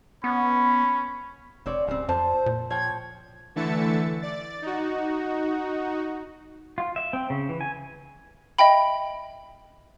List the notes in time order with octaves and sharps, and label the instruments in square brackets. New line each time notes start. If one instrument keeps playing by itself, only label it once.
[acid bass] B3 [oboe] C#4 [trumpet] B5
[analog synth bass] F1 [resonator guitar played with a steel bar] C4 C#5 D5
[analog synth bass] D1 [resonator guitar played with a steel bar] C#3 G3 C4
[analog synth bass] F2 [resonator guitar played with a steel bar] F4 A5 [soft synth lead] C5
[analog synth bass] A#2
[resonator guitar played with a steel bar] F3 C#5 G5 [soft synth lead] G#6
[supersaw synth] D3 E3 A3 E5 A6 C#7
D5 A6
D#4 F#4
[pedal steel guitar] F4
E5
C4
C#3
E3
G#5
[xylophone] D#5 E5 G5 B5